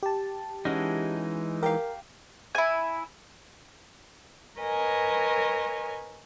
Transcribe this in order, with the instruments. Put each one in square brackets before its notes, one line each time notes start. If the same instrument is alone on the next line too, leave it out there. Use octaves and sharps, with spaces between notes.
[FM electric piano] G4 A5
[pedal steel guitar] E3 G#3 D#4 [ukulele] C#4 F#4 D#5
[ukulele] G4 F5 [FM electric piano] A#4
[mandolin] E4 G#5
[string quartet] A#4 B4 C#5 D#5 G#5